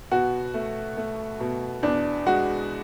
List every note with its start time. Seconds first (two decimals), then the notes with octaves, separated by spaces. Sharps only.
0.11 B2 F#4
0.54 A3
0.97 A3
1.40 B2
1.83 E2 D4
2.26 G#3 F#4